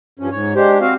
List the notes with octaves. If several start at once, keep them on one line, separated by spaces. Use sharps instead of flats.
G2 F3 C#4
G#2 C#5
G#3 D4 G4 C5
C4 F#4 F5